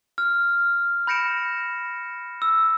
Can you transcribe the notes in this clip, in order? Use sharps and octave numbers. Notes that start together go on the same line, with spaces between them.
F6
B5 G6 A#6 C#7 D7 E7
E6